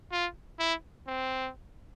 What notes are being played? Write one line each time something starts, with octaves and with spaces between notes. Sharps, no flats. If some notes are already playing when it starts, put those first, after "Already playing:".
F4
E4
C4